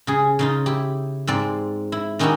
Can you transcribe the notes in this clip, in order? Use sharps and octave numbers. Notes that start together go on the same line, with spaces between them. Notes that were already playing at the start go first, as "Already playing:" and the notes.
C#3 G#4
C#3 D#4 F4
E4 G4
G#2 C4 D5
E4
D#3 C#4 D#4 E4 F#4 G4